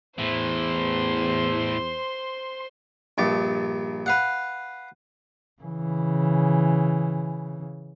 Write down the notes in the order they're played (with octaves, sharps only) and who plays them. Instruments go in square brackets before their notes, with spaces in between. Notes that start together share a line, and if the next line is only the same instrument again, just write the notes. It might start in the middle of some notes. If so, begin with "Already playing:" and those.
[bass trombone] E2 [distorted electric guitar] A2 E3 [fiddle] C5 C6
[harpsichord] A#1 G2 G4 A5
B4 F5 F#5
[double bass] C#3 E3